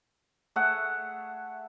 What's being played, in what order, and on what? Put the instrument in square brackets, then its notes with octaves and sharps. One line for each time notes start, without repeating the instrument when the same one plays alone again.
[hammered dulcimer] A3 G#4 E5 F#5